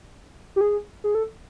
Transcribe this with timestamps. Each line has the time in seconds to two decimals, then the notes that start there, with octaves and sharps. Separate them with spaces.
0.56 G4
0.61 G#4
1.04 G#4
1.15 A4